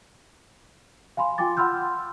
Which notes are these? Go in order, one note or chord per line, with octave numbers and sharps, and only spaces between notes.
F5 G#5 B5 C6
F4 G5 G#5 D6 A6
F#5 B5 C6 E6 F6 G6